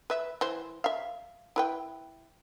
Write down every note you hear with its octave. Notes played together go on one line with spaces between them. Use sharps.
B4 E5
E3 C5
E5 F5
E4 B4 G5